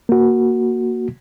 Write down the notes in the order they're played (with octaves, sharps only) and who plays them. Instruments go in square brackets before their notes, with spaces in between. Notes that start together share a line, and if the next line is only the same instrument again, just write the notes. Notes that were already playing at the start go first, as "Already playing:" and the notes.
[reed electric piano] A#3 F#4